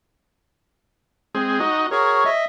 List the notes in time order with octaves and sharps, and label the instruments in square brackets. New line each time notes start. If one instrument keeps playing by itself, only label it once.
[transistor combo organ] G#3 C4 G#4
D#4 F#4 D#5
[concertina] F#4 G#4 A#4 [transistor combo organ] C#5
[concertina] D#5 E5